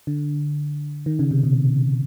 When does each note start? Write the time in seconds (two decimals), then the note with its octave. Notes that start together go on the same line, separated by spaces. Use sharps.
0.07 D3
1.06 D#3
1.19 C#3
1.31 C3
1.43 B2